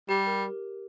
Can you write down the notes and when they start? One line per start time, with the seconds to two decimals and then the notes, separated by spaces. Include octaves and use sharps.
0.09 G3 G4
0.27 A#4